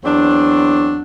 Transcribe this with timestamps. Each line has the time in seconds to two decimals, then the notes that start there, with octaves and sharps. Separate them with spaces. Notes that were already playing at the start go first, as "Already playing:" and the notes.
0.04 E2 F#3 C4 D4